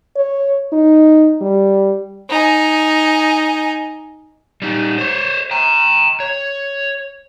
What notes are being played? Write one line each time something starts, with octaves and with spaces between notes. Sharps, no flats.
C#5
D#4
G3
D#4 G#5
G3 D#4
C5 C#5
G5 A#5
C#5